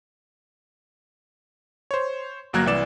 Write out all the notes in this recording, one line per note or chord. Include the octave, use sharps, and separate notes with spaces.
C5 C#5
G1 F#3 A#3 A#4 F#6 G#6
C2 E3 D5 E7